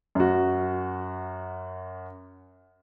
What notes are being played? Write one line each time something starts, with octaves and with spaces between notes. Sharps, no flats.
F#2 F#4